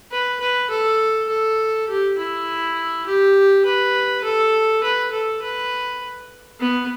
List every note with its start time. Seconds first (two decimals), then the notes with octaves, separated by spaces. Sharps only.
0.11 B4
0.40 B4
0.70 A4
1.29 A4
1.88 G4
2.18 E4
3.06 G4
3.65 B4
4.24 A4
4.83 B4
5.13 A4
5.42 B4
6.60 B3